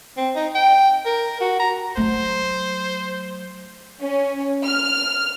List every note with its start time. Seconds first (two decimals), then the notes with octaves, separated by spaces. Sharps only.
0.17 C4
0.35 D#4
0.55 G5
1.06 A#4
1.41 F#4
1.60 A#5
1.97 F#3 A3 C5
4.02 C#4
4.64 F6